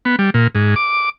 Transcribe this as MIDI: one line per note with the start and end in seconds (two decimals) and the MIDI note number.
0.05 0.16 59
0.19 0.30 55
0.34 0.47 46
0.55 0.75 44
0.76 1.09 86